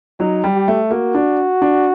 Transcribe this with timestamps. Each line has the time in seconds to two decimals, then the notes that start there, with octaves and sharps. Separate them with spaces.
0.20 F#3 D#4
0.44 G3
0.55 G4
0.68 A3
0.91 A#3 F#4
1.15 D4
1.62 D4